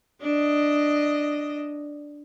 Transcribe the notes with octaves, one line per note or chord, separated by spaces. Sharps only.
D4 D#5